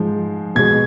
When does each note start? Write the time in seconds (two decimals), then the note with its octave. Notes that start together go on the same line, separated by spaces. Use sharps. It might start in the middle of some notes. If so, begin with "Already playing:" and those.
Already playing: G#2 F3 G#3
0.55 B2 G#3 G#6